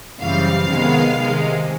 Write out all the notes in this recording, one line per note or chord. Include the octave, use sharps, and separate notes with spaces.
F#2 C#3 E3 G3 C4 F5
C3 D#3 G#3 B3
C3 D#3 G#3